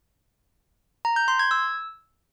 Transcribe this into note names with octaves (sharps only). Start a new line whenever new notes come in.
A#5
G6
C6
G#6
E6